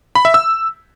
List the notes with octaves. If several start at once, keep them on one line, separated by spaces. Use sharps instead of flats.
B5
E5
E6